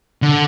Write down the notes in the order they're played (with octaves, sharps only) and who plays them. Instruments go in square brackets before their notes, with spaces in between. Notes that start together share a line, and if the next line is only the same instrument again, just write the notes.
[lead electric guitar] D3